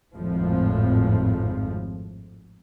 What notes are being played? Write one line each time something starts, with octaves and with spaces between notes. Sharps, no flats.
G#1 F2 A2 F3